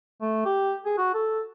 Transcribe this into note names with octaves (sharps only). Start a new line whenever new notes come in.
A3
G4
G#4
F#4
A4